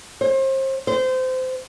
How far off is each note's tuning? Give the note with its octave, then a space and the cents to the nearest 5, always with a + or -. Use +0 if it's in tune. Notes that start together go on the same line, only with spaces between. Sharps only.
C5 +35
C5 -25